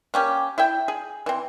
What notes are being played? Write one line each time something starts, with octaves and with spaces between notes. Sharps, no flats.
A#3 C#4 G4
E4 E5 G5
G#4
E3 C4